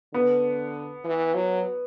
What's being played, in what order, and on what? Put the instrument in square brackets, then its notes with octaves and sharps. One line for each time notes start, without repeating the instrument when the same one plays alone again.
[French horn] D3 [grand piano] B3
[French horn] E3
F#3